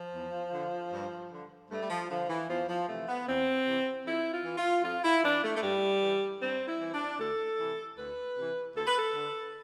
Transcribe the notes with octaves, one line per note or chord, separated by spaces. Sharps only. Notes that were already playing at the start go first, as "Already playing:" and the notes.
Already playing: F3
E2
D3
G2
D3
G2 A3
G3
F3
D3 F3
E3
E2 F3
F3
C3 E3 A3
B3
E2 C4
C3 E3
F2 E4
F4
E3
F4
F2 F4
E4
E3 D4
A3
A3
G2 G3
E3
G2 C4
E4
E3
D4
D2 A4
C3 E3
D2 B4
C3 E3
D2 A4
B4
A4
D3